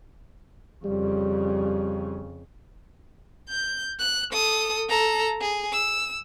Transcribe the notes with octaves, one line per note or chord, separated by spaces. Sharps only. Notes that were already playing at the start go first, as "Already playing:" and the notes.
F2 C#3 G3
G6
F#6
A4 D#6
A4 A#5
G#4
E6